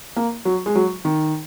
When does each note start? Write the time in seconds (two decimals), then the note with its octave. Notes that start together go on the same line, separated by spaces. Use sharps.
0.17 A#3
0.45 F#3
0.66 G#3
0.75 F#3
1.05 D#3